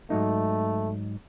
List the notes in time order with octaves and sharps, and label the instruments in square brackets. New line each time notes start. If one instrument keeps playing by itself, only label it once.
[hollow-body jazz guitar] G#2 F#3 D#4 [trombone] A3